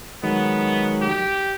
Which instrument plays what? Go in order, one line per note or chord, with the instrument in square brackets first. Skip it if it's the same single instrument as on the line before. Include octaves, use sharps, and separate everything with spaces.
[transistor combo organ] D#3 F#3 G#3 [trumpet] B3
[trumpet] G4